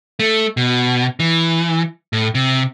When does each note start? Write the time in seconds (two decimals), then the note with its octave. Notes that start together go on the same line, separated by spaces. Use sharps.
0.20 A3
0.57 B2
1.20 E3
2.13 A2
2.35 C3